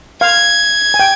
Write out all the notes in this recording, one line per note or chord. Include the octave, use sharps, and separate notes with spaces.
F5 G#6
G#5
G5